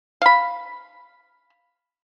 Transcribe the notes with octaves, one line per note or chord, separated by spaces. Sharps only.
F5 B5